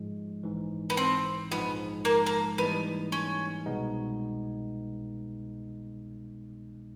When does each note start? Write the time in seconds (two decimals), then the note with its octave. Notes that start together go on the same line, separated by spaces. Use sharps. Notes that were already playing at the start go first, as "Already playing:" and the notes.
Already playing: G#2 F3 G#3
0.43 A#1 G#2 E3
0.90 B3
0.97 C4
1.51 A#1 G#2 F3 G#3 B3
2.05 A#3
2.26 A#3
2.58 G#2 E3 G3 A#3 B3 D#4
3.12 C#4
3.66 C2 B2 G#3 B3 D#4